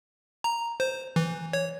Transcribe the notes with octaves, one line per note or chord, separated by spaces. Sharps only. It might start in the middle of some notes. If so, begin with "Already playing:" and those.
A#5
C5
E3
C#5